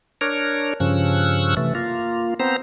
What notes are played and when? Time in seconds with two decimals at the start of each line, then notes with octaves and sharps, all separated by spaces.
0.21 D4 A#4 C#5
0.80 G2 C#3 F3 C#4 E6 F#6
1.57 C3 E3 A3
1.75 A#3 F4
2.40 B3 C4 C5 A#5